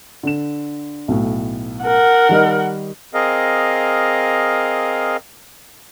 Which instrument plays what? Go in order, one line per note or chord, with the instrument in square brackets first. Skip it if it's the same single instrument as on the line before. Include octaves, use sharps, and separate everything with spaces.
[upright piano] D3 E7
B1 A2
[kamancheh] A#4 F#5
[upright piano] D#3 G3 D#4
[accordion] C4 G#4 A#4 D#5 F5